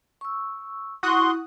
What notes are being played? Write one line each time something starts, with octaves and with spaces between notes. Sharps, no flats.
C#6 E6
E4 F#4 C6 C#6 D#6 F#6